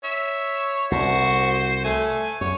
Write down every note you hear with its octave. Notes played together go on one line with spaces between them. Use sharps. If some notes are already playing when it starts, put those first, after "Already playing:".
C#5 E5
C2 F#4 C5
A3 G#5
F#2 C#5